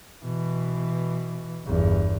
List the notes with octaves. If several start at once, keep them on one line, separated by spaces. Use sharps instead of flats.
B2 E3
G1 E2